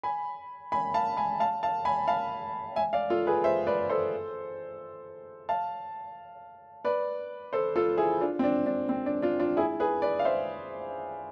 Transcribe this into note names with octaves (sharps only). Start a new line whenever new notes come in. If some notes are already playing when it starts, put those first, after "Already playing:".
G#5 B5
G#5 B5
F5 A5
G#5 B5
F5 A5
F5 A5
G#5 B5
F5 A5
E5 G#5
D5 F5
F4 A4
G#4 B4
C5 E5
B4 D5
A4 C5
F5 A5
B4 D5
A4 C5
F4 A4
E4 G#4
D4 F4
C4
D4
D4
C4
D4
D4 F4
D4 F4
E4 G#4
G#4 B4
B4 D5
F5
C5 E5